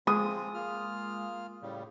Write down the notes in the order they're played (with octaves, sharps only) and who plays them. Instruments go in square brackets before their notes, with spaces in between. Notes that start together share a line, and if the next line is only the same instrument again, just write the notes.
[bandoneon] F3 C4 F4 [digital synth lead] G#3 [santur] D#6
[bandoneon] A#3 F4 F6
A2 C#3 G3